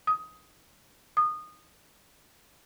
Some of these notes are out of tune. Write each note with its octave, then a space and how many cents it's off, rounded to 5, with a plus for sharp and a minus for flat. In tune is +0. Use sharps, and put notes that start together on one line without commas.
D#6 +15
D#6 -20